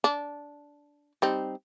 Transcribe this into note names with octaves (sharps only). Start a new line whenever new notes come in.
D4
G3 C4 D#4